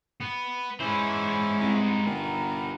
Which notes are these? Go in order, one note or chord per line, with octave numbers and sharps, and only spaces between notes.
B3
E3 G#3 B3 C#4 E4 C5
C2 B3 D#4
G1 A#4